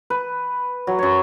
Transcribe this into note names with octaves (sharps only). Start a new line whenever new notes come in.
B4
F#3
F#2 C#5